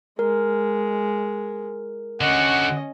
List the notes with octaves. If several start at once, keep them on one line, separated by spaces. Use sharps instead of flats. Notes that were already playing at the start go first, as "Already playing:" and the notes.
G#3 A#4
D3 C#4 F#4 D#5 F#5